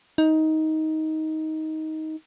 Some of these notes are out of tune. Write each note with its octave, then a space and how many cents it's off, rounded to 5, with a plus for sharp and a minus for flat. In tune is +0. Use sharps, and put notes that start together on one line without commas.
D#4 +15